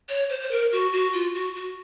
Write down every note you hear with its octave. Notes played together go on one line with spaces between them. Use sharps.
C#5
C5
C5
A#4
F#4
F#4
F4
F#4
F#4